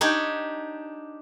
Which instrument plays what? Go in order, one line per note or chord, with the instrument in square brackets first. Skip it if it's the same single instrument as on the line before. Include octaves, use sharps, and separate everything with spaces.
[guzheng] D4 D#4 G4 C#5